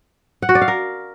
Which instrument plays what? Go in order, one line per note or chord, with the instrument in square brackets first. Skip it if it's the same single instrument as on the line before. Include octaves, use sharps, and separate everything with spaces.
[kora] F#5
F#4
D5
F5
A#4